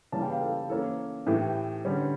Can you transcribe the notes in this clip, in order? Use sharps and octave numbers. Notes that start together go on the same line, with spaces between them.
C#3 E3 G3 A#3 C#4 A5
G5
F5
A4
E3 A#3 C#4 A4
A2 E3 A3 G4
D3 G3 C#4